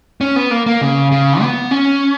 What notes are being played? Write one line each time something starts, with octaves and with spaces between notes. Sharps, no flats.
C#4
B3
A#3
A#3
C#3
C#3
B3
C#4